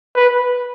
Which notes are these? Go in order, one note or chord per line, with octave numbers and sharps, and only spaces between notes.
B4